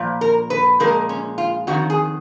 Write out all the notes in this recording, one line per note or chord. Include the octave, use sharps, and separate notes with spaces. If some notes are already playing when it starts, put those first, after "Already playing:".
Already playing: A#2 F3
A#4
B4
A#2 F3 G#3 A#4
C#4
F4
F2 D#3 F#3 F#4
G#4